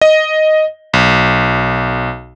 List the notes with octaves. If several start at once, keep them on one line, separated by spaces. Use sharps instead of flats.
D#5
B1